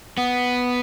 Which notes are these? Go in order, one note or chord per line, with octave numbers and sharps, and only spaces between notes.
B3